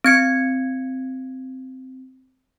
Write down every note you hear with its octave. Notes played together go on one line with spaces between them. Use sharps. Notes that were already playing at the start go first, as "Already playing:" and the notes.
C4 G#6 C#7